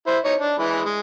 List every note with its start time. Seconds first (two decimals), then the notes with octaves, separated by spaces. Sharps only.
0.07 E4 C5
0.24 D#4 C#5
0.40 D4
0.59 E3 G#3 B5
0.85 G#3